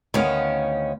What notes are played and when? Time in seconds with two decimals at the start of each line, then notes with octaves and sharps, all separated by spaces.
0.14 D2 D#3 B3 C#4 F5